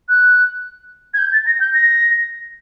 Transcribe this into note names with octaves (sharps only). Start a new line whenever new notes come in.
F#6
G#6
G6
A6
A#6
G6
A#6